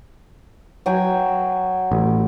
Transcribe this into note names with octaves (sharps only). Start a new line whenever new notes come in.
F#3 G5 G#5
A1